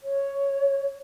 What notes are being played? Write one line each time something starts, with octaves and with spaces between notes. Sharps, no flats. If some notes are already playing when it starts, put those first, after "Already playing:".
C#5